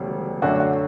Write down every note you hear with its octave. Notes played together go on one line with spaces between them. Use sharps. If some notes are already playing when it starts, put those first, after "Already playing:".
Already playing: E1 D2 C#3 G3
F#2 D3 A3 D4 F#4
F#4